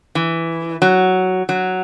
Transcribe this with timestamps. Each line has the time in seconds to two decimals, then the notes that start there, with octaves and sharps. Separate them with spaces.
0.15 E3
0.82 F#3
1.49 F#3